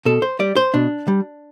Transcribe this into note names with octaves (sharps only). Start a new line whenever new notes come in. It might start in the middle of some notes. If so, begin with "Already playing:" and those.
B2 A4
C5
G3 D5
C5
B2 D4
G3